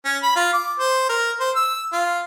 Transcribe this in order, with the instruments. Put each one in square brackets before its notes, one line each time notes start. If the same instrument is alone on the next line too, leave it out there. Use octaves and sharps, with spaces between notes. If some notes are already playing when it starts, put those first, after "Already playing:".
[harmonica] C#4
B5
F4
D6
C5
A#4
C5
E6
F4